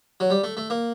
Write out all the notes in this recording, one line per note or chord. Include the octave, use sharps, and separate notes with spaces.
F#3
G3
A3
A3
A#3